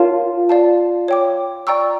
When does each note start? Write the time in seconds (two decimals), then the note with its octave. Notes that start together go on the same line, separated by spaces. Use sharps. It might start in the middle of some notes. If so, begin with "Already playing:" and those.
Already playing: F4 A#4 C#5 F5 A5
0.49 D5 F5 A5
1.08 C#5 G5 D6
1.67 D5 G5 A#5 C#6 E6